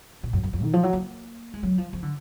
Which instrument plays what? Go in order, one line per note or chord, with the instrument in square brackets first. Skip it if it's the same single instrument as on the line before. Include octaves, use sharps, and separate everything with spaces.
[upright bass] A#2
F#2
F#2
F2
D#3
F3
F#3
A#3
G#3
F#3
F3
F3
D3